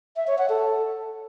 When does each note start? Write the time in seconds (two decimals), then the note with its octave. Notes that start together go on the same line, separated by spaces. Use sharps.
0.16 E5
0.27 C#5
0.38 F#5
0.49 A4